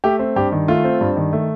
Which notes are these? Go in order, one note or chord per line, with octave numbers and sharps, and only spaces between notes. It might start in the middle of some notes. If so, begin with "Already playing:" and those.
A3 G4
C4
G2 G4
D#3
A3 F4
C4
G2
D#3
A3